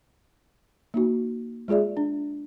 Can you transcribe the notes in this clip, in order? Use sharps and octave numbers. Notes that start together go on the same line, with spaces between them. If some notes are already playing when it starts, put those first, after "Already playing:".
A#3 D#4 F#4
G#3 F4 G#4 D5 E5
D4